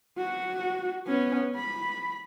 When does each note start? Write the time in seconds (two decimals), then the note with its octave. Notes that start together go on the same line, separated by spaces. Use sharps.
0.18 F#4
1.07 B3 C#4
1.56 B5